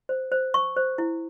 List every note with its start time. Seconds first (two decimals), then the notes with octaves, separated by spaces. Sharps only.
0.09 C5
0.32 C5
0.54 C5 C#6
0.77 C5
0.98 E4